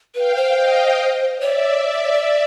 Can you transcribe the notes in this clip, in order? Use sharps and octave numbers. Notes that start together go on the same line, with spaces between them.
B4 F5 G5
C5
D#5 F5
C#5 D5 E5
D5
C#5
D5